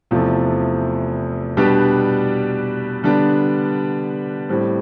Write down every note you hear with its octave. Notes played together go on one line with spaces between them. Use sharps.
E2 C3 F3 A3
B2 G3 D4 G4 B4
D3 G3 B3 D4
A2 G3 C4